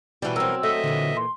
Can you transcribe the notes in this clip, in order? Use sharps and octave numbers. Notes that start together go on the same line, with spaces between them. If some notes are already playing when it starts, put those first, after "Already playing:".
B2 E3 G3 D4 F#4
F#3 C4 A#4 E6
A3 D#5 E5
A#2 D3 E3
C6